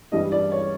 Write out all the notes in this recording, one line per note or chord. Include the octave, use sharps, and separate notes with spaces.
G2 E3 G3 D#5
D5
C#5